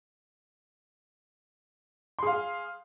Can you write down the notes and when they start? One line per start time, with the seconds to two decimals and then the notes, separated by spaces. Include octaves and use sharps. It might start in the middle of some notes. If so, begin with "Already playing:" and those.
2.19 C6
2.23 G#4
2.27 F5